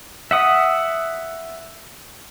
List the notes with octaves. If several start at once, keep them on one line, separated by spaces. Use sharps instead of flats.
E5 F#5 D#6